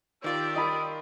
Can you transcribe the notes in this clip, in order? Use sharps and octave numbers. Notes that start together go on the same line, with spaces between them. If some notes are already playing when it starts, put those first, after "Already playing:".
D#3 F4 G4 A#4 D5 E6
D#5 B5 D#6